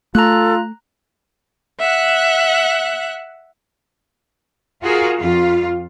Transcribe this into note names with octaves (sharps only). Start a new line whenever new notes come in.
A3 F4 A4 A#5 F#6
E5 F#5 F#6
F4 F#4 G#4 A#4 F5
F2 F4 F5